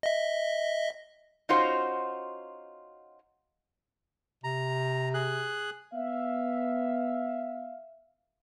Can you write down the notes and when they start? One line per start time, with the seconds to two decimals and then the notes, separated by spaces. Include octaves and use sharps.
0.03 D#5 E5
1.49 C#4 D#4 F4 F#4 C5
4.44 C3 A#5
5.14 G#4 F#6
5.93 B3 E5 F5